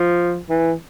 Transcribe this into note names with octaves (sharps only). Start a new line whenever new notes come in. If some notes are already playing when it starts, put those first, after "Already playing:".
Already playing: F3
E3